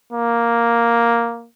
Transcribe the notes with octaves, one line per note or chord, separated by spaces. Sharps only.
A#3